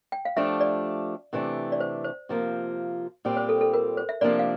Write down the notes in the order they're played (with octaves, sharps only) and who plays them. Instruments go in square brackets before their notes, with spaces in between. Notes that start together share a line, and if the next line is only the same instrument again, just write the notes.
[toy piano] G5
F5
[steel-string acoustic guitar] F3 A3 D4 G4 [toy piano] E5
[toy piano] D5
[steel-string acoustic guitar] C3 E3 A3 D4 G4
[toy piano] D5
C5
C5
[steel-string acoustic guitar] C3 F3 A#3 F4
A#2 G3 C4 G4
[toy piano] C5
A4
A4
A#4
C5
E5
[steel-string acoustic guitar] C3 F3 A#3 D4 [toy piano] D5
[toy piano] F5